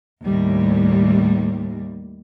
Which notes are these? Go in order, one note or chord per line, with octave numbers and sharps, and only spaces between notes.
D#2 A2 G3